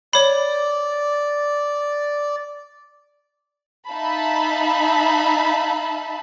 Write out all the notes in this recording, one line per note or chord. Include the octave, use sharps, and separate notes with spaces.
C#5 D5 B5
D#4 E5 F5 A5 B5